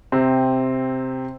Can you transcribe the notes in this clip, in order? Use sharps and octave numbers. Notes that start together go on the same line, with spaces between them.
C3 C4